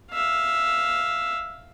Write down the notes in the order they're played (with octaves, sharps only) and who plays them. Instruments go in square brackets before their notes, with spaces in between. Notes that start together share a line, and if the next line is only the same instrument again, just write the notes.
[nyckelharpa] E5 F5